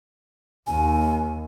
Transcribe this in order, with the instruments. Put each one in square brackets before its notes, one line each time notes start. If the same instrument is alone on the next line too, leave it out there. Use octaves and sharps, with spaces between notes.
[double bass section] D#2 [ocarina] G#5